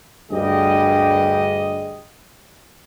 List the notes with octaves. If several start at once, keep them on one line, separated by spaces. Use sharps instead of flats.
D2 G2 G3 G4 G#4 D#5